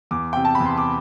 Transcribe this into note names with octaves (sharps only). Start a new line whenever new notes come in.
E2 D6
C3 G5
A5
B5
E2
C6
D6